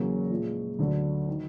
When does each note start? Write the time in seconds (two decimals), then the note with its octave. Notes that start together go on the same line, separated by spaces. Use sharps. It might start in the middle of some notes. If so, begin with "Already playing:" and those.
Already playing: E2 C#3 F#3 A#3 C#4
0.30 A#2 F3 G#3
0.79 D2 D3 F#3
1.29 D#3